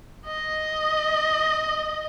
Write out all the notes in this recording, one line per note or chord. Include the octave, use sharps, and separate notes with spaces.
D#5